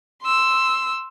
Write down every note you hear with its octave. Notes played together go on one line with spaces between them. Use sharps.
C6 E6